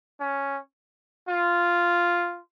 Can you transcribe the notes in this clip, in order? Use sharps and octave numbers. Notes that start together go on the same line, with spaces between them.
C#4
F4